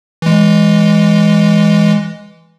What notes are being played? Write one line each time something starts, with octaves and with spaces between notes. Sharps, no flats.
E3 G#3